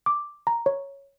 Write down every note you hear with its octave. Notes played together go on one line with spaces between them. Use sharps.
D6
A#5
C#5